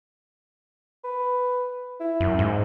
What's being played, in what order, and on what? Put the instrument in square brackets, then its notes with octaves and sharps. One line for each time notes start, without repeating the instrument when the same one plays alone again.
[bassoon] B4
E4
[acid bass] F#2
G#2